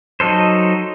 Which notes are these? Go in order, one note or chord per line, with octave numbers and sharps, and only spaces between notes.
F#3 D#4 A4 C5